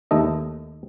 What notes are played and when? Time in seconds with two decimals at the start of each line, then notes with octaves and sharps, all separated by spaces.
0.11 D#2 A3 A4 D#5